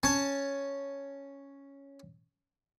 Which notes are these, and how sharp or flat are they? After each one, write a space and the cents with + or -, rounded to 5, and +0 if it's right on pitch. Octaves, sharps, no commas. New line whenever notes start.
C#4 +0 A5 +0